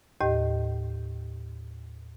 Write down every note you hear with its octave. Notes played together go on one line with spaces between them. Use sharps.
D#2 A2 G4 D#5